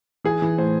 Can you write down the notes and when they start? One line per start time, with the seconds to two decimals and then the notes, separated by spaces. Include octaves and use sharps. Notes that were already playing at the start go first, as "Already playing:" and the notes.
0.24 E3 G#4
0.42 E3
0.58 A2 C5